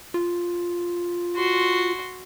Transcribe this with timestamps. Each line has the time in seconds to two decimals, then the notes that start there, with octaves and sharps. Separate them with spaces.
0.14 F4
1.36 F#4 C6